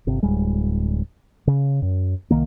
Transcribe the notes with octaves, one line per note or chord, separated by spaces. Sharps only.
G1 C3
D1 G3 G#3
C#3
F#2
C2 D#3 A#3